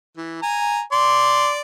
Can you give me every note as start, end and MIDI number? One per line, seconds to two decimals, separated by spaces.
0.17 0.39 52
0.42 0.81 80
0.42 0.81 82
0.92 1.61 74
0.92 1.61 84
0.92 1.61 86